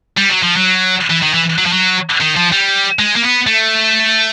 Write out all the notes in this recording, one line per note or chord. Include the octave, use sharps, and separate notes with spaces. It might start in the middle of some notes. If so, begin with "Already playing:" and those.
G3
F#3
F3
F#3
E3
D#3
E3
F#3
F3
F#3
D#3
F3
G3
G#3
A#3
B3
A3